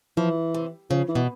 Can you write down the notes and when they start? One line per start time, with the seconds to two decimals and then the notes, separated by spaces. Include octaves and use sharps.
0.17 E3 F3
0.54 C3
0.90 C#3 F3
1.09 E3
1.15 B2